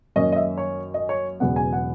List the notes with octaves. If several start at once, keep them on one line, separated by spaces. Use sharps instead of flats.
F#2 D#3 A#3 C#4 D#5
D#5
E5
C#5
D#5
C#5
E1 E2 C#3 F#3 B3 F#5
G#5
F#5